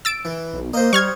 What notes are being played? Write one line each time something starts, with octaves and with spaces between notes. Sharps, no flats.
E6 A6 D7
E3
B1
A#3 C5 D#5
G3 C#6 F6 G#6